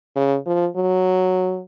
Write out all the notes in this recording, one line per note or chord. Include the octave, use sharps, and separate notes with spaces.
C#3
F3
F#3